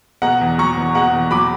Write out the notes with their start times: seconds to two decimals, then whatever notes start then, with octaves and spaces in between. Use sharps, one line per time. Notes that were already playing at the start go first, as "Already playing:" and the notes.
0.22 B2 F#5 A#5
0.41 E2
0.58 F#3 A#5 C#6
0.77 E2
0.95 B2 F#5 A#5
1.13 E2
1.31 F#3 B5 D6